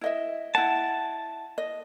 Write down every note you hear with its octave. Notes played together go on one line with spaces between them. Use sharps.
E4 D#5 E5
E4 F#5 A5
D#5